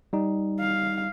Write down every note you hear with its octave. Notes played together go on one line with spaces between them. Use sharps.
G3 D#4
F5